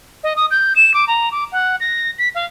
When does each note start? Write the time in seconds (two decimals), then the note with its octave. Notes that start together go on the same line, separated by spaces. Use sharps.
0.23 D#5
0.36 D#6
0.51 G6
0.76 E7
0.94 D6
1.08 A#5
1.32 D6
1.52 F#5
1.80 A#6
2.18 B6
2.35 F5